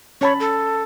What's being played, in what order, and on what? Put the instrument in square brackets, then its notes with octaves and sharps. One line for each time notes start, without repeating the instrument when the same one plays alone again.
[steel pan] C#4 A5 B5 [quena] C#5
[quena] A4